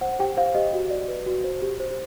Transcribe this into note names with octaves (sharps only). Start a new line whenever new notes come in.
C5 F#5
G4 G5
C5 F5
G4 D#5
F#4
D5
B4
F#4
C5
G4
C5